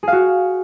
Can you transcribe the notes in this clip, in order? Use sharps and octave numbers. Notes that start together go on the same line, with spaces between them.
F#4 G#4 F5